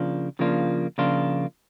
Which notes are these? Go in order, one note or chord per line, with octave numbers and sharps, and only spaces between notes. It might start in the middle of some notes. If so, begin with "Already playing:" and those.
Already playing: C#3 F3 A#3 D4 F4
C#3 F3 A#3 D4 F4
C#3 F3 A#3 D4 F4